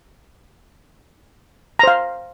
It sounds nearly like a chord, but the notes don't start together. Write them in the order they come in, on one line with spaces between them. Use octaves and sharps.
A#5 C5 F5